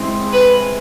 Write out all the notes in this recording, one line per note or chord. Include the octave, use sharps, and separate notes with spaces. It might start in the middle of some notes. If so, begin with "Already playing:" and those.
Already playing: G#3 C4 E4 G#4
B4